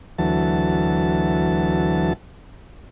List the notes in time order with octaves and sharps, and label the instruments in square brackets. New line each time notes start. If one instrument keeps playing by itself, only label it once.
[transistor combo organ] D2 E3 F#3 A5